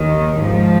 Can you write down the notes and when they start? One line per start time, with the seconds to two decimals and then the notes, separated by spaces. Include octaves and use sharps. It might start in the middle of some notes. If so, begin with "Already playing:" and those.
Already playing: D#2 D#3
0.39 G#2 F3